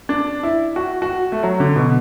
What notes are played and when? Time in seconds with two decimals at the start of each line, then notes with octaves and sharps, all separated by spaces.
0.09 D4
0.43 E4
0.76 F#4
1.02 F#4
1.32 A3
1.43 F#3
1.60 D3
1.76 B2